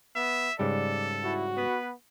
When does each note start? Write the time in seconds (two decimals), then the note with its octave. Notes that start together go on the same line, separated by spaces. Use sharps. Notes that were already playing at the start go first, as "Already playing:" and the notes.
0.16 B3 E5
0.59 G#2 C#3 G3 A4 D5
1.24 E4 F#4
1.57 B3 B4